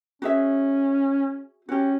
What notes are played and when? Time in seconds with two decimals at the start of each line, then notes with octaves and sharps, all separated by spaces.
0.22 C#4 F#4 G#4 E5
1.69 C#4 F#4 G4